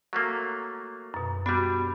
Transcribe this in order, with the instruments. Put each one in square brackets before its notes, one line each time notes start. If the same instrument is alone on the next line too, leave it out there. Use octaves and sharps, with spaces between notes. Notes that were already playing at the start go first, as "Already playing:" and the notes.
[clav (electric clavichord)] F#3 A3 A#3
[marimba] F#2 B2
[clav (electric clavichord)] G3 D4 [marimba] B3 F#4